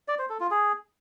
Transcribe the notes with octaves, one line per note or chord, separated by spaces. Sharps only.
D5
C5
A4
F4
G#4